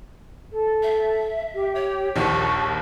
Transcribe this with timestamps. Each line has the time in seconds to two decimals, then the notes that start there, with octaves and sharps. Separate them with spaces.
0.52 A4
0.83 E5
1.55 G4
1.75 C#5
2.16 A#1 D#2 F3 G4 C#6